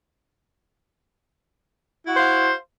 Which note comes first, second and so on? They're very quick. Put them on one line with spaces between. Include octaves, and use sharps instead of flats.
E4 F#4 F#5 C5 F5